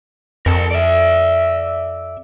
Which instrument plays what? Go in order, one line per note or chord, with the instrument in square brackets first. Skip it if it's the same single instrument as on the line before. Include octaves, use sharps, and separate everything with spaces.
[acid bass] F2 [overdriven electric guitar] A#4 A5
[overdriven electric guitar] D5 E5